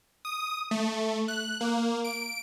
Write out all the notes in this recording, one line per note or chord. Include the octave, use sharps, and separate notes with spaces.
D#6
A3
F#6
A#3
D7